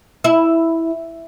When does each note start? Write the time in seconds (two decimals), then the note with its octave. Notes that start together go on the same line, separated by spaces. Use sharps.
0.24 E4